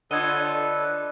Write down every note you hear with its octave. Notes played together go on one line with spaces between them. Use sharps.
D3 F4 A4 B4 C#5 D#5